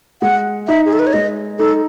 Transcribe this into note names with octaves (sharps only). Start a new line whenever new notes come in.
G#3 F#5
D#4 E5
G#4
A4
B4
C#5
G#3 D#5
D#4 A4